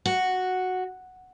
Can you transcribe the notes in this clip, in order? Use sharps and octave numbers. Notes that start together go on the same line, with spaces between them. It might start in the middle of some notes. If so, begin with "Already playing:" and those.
F#4